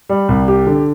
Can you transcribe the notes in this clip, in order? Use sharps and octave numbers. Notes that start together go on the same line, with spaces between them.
G3
C2
G4
D3